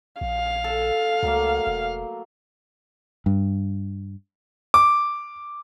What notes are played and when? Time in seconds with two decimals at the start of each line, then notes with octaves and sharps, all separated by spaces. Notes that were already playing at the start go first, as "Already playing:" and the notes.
0.21 A#1 F5
0.64 A4
1.23 C#2 F#3 A3 A#3
1.67 E1
3.26 G2
4.74 D6